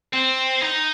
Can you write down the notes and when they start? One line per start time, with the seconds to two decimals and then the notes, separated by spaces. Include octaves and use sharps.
0.13 C4
0.61 D#4